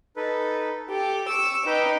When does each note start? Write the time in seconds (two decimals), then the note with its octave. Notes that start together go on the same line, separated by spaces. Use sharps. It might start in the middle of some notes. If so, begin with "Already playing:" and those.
0.16 D#4 A4 B4
0.91 G4 A4
1.29 C#6 D6 E6
1.66 D#4 B4 G5 D6